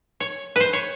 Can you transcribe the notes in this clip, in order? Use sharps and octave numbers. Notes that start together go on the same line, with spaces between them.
C#5
B4 C5
C#5